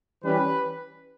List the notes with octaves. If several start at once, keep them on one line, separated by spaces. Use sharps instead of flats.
E3 G3 C#4 B4